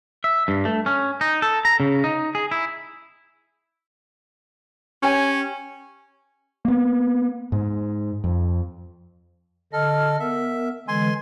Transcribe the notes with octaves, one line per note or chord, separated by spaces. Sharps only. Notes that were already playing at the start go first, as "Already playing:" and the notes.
E5
G2
A3
C#4
D#4
A4
A#5
C#3
D#4
G#4
E4
C#4 G4 C#5 G#5
A#3 B3
G#2
F2
D3 A4 D#5 F6
B3 A#4 E5
D3 E3 G#3 G#5 C6